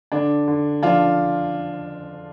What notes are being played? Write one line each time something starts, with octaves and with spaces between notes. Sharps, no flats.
D3 D4
D3
F3 D4 F4